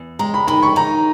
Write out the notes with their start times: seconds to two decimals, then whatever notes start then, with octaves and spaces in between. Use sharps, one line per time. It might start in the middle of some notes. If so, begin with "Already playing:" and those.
Already playing: E2
0.19 G#3 A#5
0.34 B5
0.48 D#3 B5
0.63 C#6
0.76 D#4 A#5